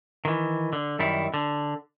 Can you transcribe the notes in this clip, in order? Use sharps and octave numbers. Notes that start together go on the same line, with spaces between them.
D#3 E3
D3
F#2 D#3 G3 E4
D3